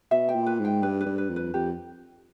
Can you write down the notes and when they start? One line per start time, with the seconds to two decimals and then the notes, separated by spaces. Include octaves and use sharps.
0.11 B2 E5
0.29 G5
0.35 A#2
0.47 B4
0.59 G#2
0.65 G5
0.82 G2 B4
1.01 G2 B4
1.18 B4
1.30 F2
1.36 B4
1.54 F2 G4